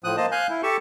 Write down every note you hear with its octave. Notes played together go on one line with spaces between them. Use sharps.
A2 F3 D#6 F#6
A#3 C5 D#5 A5
F5 G#5 F#6 G6
E4
G4 A4 A5 C#6